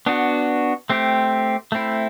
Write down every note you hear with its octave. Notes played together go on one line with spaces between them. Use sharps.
B3 D4 F#4
A3 C4 G4
A3 C4 E4